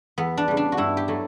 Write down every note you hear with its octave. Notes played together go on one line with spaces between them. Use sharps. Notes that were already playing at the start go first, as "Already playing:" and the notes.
E2 B3
D4
C#3 G3
D4
F#4
G2 E4
G4
F#3 A3